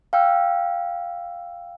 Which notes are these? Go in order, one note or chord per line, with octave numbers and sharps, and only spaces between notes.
F5 G5 E6